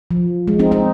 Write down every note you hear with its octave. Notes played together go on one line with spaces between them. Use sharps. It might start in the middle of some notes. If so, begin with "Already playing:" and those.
F3
G#3
C4 D#4
C4 D#4